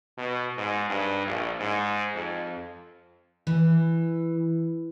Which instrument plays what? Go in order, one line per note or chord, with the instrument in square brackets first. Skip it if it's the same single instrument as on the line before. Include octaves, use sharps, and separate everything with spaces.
[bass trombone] B2
G#2
G2
A#1
G#2
F2
[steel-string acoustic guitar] E3